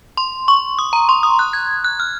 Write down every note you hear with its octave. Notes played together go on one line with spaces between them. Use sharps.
C6
C#6
D#6
A#5
C6
D#6
F#6
G#6
F#6
F6